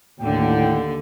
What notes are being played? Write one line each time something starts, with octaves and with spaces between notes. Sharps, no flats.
D#2 A2 D3 G5